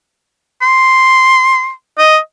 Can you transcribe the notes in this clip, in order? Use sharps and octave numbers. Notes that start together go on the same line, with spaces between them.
C6
D#5